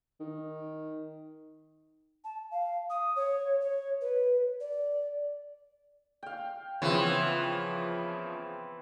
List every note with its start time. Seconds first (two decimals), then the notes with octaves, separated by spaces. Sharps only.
0.20 D#3
2.24 A5
2.51 F5
2.90 D#6
3.16 C#5
3.61 C#5
4.01 B4
4.60 D5
6.23 F5 G5
6.82 C#3 E3 F3 B3 C4 C#5